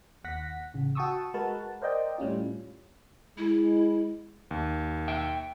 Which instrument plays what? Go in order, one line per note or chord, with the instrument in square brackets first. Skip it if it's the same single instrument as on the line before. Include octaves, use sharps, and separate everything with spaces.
[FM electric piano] D#2 F#5 A#6 B6
A1 C#3
F#4 G5 A5 C#6 D#6 E6
G#3 F#4 A#4 B4 F#5 A5
A#4 C5 D5 D#5 G5
A2 G3 C#4 F4
[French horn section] G#3 [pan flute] E4
[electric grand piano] D#2
[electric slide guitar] E5 G5